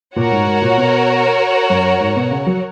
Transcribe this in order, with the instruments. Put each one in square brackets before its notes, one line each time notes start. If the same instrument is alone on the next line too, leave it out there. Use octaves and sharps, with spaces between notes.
[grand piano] A#2 [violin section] F#4 A#4 C#5 F#5
[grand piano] G#2
G#2
A#2
B2
F#2
G#2
B2
C#3
F#3